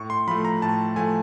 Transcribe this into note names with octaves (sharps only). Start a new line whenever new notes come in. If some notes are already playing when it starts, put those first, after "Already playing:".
Already playing: A2 C#6
C6
F3 A3 B5
A#5
A2 A5
F3 A3 G#5